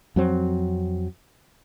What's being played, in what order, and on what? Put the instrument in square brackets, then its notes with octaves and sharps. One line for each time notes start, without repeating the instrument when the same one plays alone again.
[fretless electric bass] F2 F#3 C4